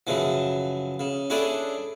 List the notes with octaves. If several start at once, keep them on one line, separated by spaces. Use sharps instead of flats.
F#2 C#3 E3 F3
C#3
C#4 D4 E4 G#4 A4 D5